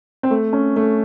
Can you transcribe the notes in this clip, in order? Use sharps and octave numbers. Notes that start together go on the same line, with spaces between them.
C4
A3
C#4
A3